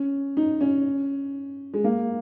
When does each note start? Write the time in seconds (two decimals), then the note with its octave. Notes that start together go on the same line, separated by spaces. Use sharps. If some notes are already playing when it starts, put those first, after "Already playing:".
Already playing: C#4
0.37 D#4
0.61 C#4
1.74 G#3
1.84 A#3